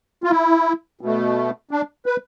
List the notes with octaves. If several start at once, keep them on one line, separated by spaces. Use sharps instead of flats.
F4
E4
B2 A3
D4
B4